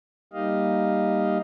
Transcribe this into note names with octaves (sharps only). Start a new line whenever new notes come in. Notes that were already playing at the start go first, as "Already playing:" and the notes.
G3 A#3 D#4 G4 D#5 F5